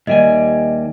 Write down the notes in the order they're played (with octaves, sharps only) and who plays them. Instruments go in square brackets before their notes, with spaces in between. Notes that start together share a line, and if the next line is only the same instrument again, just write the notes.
[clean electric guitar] D#2 G3 G#5 [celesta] D#5 E5